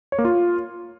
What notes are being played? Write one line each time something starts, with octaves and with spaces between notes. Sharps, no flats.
C#5
A#3
F4